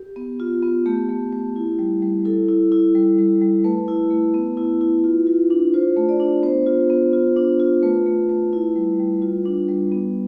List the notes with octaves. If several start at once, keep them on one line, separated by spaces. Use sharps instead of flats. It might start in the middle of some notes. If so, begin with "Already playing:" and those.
Already playing: G4
B3
F4
B3
A3 G4
A3
A3
E4
G3
G3
E4 A4
E4
E4
G3
G3
G3
A3 B4
E4
A3
B3
E4
E4
F4
F4
D4
F4 C5
A3
D5
D4
B3 C5
F4
B3
F4
D4
F4
A3 B4
A3
A3
E4
G3
G3
F4
D4
G3
B3